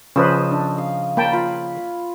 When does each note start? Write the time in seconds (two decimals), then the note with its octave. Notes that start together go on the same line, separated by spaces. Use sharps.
0.16 C#3 F3 C#4 B4 C5 D#5 D#6 E6
0.51 D4
0.78 F5
1.17 A#3 C#5 G5 A5 B5
1.32 F4 B5